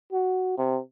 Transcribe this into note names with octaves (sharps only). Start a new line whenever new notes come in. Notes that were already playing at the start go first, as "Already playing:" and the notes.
F#4
C3